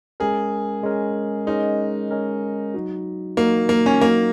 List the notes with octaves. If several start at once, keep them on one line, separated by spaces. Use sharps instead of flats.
G#3 C#4 G#4 A#4
G#3 C#4 A#4
G#3 C#4 D#4 A#4
G#3 C#4 A#4
F#3 D#4 F#4
F#3 A#3 D#4 F#4
A#3
C#4
F#3 A#3 D#4 F#4